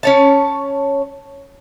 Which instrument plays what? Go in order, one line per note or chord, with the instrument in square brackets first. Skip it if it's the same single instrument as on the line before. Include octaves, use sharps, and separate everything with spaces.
[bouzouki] C#4 C#5 A5